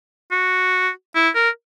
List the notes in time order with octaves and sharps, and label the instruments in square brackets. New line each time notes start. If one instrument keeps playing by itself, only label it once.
[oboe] F#4
E4
A#4